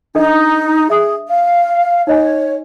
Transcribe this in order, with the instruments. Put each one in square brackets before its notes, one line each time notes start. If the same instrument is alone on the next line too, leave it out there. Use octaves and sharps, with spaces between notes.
[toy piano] D4 A4 D#5 [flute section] D#4
[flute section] G#4 [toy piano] E5 D#6
[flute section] F5
[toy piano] D#4 D#5 G#5 [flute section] C#5